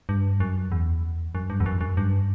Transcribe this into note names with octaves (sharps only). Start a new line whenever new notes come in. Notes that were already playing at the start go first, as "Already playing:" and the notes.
G2
F#2
E2
F#2
G2
E2
F#2
F#2
G2